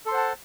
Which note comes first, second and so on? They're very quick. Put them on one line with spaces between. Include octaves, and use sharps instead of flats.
A4 C6 C5 F#5 A5